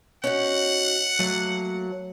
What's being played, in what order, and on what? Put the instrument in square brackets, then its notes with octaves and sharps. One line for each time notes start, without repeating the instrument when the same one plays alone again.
[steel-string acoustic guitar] C#4 D#4 F#4 [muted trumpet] F#5
[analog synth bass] F#3 [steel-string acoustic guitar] A3 A#3